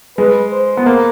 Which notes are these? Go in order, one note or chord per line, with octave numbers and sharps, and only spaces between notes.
G#3 B4
C5
B3
A#3